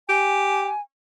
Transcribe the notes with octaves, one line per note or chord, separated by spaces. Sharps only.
G4 G#5